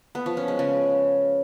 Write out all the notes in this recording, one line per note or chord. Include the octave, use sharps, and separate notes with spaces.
B3
F3
C#4
G#3
C#3